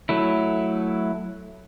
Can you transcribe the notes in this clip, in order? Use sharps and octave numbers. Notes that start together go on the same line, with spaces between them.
F#3 A3 E4